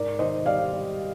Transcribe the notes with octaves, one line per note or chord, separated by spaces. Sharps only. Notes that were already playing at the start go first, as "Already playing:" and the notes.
Already playing: G#2 A#4 D5
D#3 C5 D#5
G3 D5 F5
G3